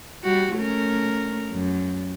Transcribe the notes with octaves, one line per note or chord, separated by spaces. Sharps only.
G3 F#4 G4
A3 C#4 A#4
F#2